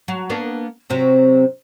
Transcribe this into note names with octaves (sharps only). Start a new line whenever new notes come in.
F#3
A#3 B3 D4
C3 F#3 C4